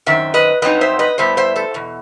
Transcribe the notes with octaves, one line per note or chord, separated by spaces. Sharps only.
F#2 D#3 C4 E5
B4 D#5
G2 F#3 C4 D#4 B4 D#5
C5 E5
B4 D#5
A2 G3 B3 C5 E5
C5 E5
A4 C5
E2 B2